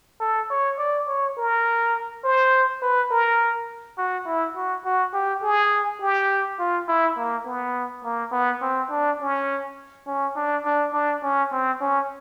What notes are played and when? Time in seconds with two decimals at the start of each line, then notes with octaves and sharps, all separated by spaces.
0.20 A4
0.50 C#5
0.79 D5
1.07 C#5
1.37 A#4
2.24 C5
2.82 B4
3.11 A#4
3.98 F#4
4.26 E4
4.56 F#4
4.85 F#4
5.14 G4
5.43 G#4
6.01 G4
6.59 F4
6.88 E4
7.17 A#3
7.46 B3
8.05 A#3
8.32 B3
8.62 C4
8.90 D4
9.21 C#4
10.07 C#4
10.36 D4
10.65 D4
10.93 D4
11.23 C#4
11.52 C4
11.81 C#4